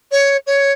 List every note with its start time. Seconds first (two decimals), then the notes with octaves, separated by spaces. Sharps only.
0.12 C#5
0.47 C#5